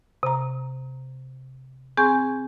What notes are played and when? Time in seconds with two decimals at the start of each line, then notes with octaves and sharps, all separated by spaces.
0.23 C3 A#5
1.97 C4 G#4 G#5 C#6 G6